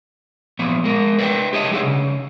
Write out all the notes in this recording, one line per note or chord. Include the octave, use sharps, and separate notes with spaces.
A#2 F3 B3 D5
G#3 A#4
B4 D5 E5 F#5 G5
G4 C#5 D#5 E5 A5
G3 A3 D#4 G#4 D5 F#5
C#3